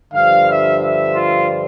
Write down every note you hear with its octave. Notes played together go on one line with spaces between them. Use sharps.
G2 D3 F3 F5
E5
E5
F4